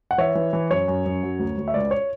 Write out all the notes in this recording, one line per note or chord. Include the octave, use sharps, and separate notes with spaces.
F#5
E3 C#5 E5
E3
E3
F#2 C#5
F#2
F#2
F#3
D2
D2
E5
C#2 D5
C#5